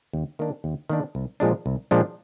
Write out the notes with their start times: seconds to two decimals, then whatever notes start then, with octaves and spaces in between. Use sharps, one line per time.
0.13 D#2
0.39 D#3 A#3 D4
0.64 D#2
0.89 D#3 A#3 D4
1.15 C2
1.40 A#2 F3 G#3 D4
1.66 C2
1.91 A#2 F3 G#3 D4